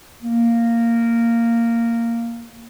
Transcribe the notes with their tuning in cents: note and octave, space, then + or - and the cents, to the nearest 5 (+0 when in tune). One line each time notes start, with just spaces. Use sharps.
A#3 -10